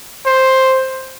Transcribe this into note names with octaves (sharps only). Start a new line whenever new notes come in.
C5